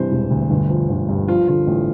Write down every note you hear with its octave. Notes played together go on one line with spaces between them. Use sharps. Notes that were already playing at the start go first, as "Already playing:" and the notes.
Already playing: G2 C3 E3 C5
E1
D2
G1
F3
G1
G2
F3 F4
D3 F4
A1